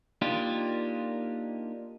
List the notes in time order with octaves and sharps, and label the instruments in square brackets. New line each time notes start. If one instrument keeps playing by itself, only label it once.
[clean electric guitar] A#3 D4 D#4 F4 G4 A#4